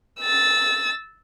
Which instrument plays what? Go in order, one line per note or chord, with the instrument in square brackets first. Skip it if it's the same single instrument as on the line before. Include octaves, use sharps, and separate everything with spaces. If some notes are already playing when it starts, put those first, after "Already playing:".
[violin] E6 A6